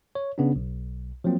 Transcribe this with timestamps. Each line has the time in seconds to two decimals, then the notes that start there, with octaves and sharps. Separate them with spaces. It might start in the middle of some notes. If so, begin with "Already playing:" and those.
0.15 C#5
0.38 C#3 B3 C#4 D4
0.56 B1
1.24 F3 F#3 A#3 C4